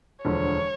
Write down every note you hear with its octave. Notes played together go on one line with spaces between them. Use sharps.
E1 D2 D3 F3 C#5